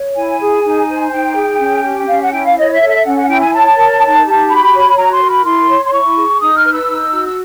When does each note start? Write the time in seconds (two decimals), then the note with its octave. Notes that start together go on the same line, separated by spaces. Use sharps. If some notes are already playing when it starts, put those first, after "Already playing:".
Already playing: C#5
0.16 E4 G#5
0.40 G#4
0.65 D#4
0.88 C5
1.12 D#4 G5
1.36 G#4
1.60 C#4
1.84 G4
2.08 C#4 F5
2.20 F#5
2.31 E4 G5
2.45 F5
2.56 C#5 D#5
2.71 E5
2.80 A4
2.88 E5
3.04 C#4 F#5
3.16 F#5
3.28 E4 G5
3.40 G#5
3.52 C#5 A5
3.76 A#4
4.01 D#4
4.25 G4
4.48 F#4 B5
4.72 C#5
4.96 F#4 A#5
5.12 C6
5.21 A#4
5.29 B5
5.44 E4 C6
5.68 C#5
5.84 C6
5.91 E4 C#6
6.16 G#4
6.40 D#4 D#6
6.55 F6
6.64 B4
6.72 E6
6.88 D#4
7.12 F#4
7.25 E6